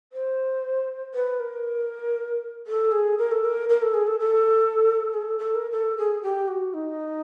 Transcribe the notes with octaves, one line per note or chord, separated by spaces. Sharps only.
C5
B4
A#4
A4
G#4
A#4
A4
A#4
A#4
A4
G#4
A4
A4
G#4
A4
A4
A#4
A4
G#4
G4
F#4
D#4